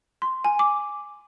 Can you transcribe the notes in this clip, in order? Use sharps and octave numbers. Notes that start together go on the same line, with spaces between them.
C6
G#5
D6